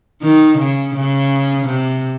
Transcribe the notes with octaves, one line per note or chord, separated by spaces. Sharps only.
D#3
C#3
C#3
C3